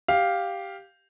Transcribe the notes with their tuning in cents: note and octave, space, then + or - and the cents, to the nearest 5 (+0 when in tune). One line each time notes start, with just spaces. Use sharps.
G4 +0 F5 +5